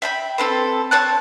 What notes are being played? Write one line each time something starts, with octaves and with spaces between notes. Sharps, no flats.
E5 G5 B5
C4 A4 B4
C4 C#5 A5 F#6